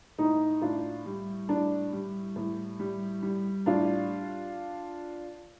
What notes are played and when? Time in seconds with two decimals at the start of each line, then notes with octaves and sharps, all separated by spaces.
0.18 A2 D#4
0.62 A2 D4 F4
1.06 G3
1.49 A2 D4
1.93 G3
2.36 A2
2.80 G3
3.23 G3
3.66 A2 D4 F4